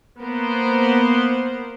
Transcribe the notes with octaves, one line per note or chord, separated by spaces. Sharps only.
A#3 B3 A#4 C5